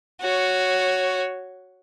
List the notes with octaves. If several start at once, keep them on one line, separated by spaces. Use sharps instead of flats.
F#4 C#5